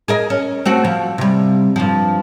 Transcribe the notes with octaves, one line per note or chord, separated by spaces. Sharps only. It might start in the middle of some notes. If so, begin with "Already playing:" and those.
G#4 A#4 D#5
C#4
A3 C4 F#4
F3
C3 G3
G2 F3